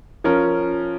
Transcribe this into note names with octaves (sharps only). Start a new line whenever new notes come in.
F3 C#4 A#4